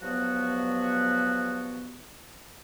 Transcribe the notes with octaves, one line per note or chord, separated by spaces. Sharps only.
G2 F3 F#3 B3 F#4